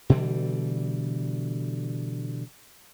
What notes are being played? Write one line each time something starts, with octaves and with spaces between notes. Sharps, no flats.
B2 D3 E3 G3